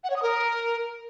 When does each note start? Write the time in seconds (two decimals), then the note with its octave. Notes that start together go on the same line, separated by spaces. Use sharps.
0.04 F#5
0.10 C#5
0.16 D#6
0.23 A#4